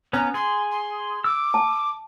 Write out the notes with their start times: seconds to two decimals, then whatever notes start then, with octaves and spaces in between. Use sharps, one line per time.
0.13 B3 C#4 A#5
0.34 G#4 C6
0.71 C6
1.24 D6 E6
1.54 A5